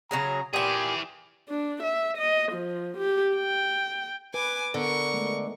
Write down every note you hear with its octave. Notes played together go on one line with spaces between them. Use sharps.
C#3 F#3 G#4 A#5
A#2 E3 G4 G#4 G#5
D4
E5
D#5
F3
G4
G5
B4 G#5 D6
D3 B3 A#4 C#6
G#3 A3